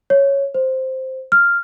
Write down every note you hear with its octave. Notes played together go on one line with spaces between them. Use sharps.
C#5
C5
F6